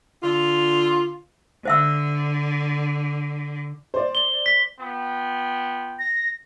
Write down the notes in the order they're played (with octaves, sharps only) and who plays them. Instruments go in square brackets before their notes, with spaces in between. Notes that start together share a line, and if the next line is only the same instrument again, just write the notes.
[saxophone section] D3 F4
[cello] D3 [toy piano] C5 E5 E6
[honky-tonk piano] C5 D5
[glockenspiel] G7
B6
[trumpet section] B3 F4 G5
[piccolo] A#6